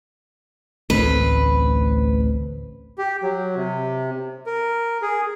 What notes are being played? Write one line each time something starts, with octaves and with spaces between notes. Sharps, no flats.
A1 D2 C4 B4
G4
F#3
C3
A#4
G#4